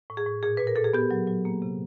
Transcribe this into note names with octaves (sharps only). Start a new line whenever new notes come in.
A2
G#4
A2
A#2 G#4
A#2 B4
A#4
A#2 A4
G#4
B3 G4
F#3
F#3
A#3
C3